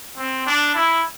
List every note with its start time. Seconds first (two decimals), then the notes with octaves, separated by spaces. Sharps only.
0.18 C4
0.47 D4
0.75 E4